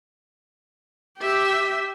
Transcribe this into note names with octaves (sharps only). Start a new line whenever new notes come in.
G4 E5